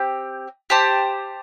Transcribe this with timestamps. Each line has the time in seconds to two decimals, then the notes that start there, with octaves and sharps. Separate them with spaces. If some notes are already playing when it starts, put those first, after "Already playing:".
Already playing: C4 G4 G5
0.70 G4 C5 A5